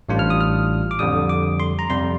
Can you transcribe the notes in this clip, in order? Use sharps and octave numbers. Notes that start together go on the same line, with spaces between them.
A1 A2 G3 D4 F4
F6
D#6
F6
D6
F2 D3 G3 D#6
D6
C6
A#5
F2 C3 G3 C6